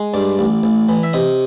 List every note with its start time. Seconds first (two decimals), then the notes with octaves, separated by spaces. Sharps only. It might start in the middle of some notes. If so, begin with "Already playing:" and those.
Already playing: G#3
0.14 G2 D5
0.39 A1
0.63 A1
0.89 E3
1.03 E5
1.13 C3 D#5